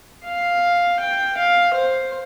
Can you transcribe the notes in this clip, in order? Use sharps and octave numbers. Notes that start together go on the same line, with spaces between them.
F5
G5
F5
C5